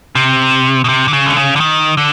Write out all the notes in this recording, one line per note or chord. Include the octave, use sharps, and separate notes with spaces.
C3
B2
C3
D3
C#3
D3
C#3
D3
D#3
D3